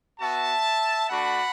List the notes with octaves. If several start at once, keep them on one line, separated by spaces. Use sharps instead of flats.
B3 F#4 E5 A5
A3 D4 F#4 F#5 B5